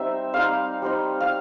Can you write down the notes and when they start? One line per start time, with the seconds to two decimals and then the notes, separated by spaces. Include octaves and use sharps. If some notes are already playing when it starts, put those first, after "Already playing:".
Already playing: G3 C4 D#4 E5
0.33 G3 C4 D#4 F5
0.82 G3 C4 D#4
1.21 F5